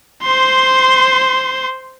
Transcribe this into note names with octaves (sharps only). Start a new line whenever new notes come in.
C5 C6